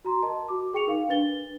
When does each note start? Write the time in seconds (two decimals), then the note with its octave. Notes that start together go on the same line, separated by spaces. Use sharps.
0.05 F#4 A#5 C6
0.23 A#4 D#5 A5
0.48 F#4 D6
0.73 G#4 G5 C#6 C#7 F7
0.87 D#4 A#4 F5
1.09 D4 B4 A6 G7